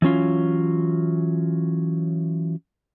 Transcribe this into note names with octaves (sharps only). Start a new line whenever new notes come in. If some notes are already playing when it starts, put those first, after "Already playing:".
E3 F#3 C#4 F4